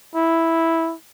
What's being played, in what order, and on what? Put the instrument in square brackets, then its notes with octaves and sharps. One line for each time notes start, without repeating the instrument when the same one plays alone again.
[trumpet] E4